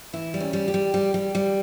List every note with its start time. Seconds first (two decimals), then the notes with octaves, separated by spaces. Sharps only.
0.13 E3 E4
0.34 G3
0.40 C#4
0.53 G3
0.68 G4
0.74 G3
0.94 G3
1.14 G3
1.35 G3